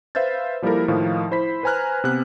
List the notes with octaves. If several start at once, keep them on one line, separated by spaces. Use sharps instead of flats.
B4 C5 E5 F5 G6 A6
F3 G3 A#3 E4 A4 A#4
A2 D#3 F3 F5
E4 C5 B5 B6
B4 C5 G#5 A#5 F6 F#6
C3 B3 F#6